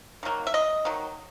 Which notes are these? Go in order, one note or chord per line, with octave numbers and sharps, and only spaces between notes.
D#3 F#3 A#3
E5
D#5
D#3 F#3